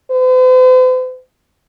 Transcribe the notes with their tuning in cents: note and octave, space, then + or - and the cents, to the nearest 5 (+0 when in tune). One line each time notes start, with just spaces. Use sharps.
C5 -45